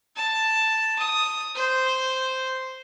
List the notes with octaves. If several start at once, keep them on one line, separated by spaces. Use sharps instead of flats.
A5
D#6
C5